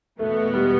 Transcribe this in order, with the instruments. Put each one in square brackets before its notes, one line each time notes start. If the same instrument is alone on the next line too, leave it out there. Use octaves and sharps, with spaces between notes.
[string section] E2 B2 B3 [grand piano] A3
[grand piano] G3